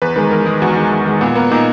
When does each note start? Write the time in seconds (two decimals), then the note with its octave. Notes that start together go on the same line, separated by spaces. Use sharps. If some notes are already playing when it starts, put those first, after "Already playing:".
0.02 E2 B4
0.16 D#3 G#3 B4
0.31 E2 A#4
0.46 D#3 G#3 G#4
0.61 E2 F#4
0.76 D#3 G#3
0.91 E2
1.06 D#3 G#3
1.21 A#2 B3
1.36 A#3 B3
1.51 A#2 D#4